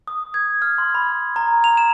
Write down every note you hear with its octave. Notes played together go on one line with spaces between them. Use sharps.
D#6
G#6
F6
C6
B5
A#5
F7
E7